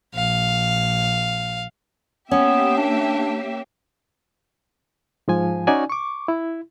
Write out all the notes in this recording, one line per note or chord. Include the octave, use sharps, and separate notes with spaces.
A#1 F5
A#3 B3 C#4 G4 E5
D4
G#2 F3 G#5
C#4 D#4 F#4 D5 G#5
C#6 D6
E4